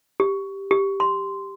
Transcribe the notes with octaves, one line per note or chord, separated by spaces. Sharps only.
G4
G4
C6